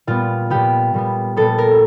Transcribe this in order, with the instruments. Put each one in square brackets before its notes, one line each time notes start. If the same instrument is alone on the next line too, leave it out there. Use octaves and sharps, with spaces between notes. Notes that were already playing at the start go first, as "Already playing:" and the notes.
[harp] A#2 G3 B3 F4
A#2 G3 B3 G4
A#2 G3 B3
A#2 G3 B3 A4
A#4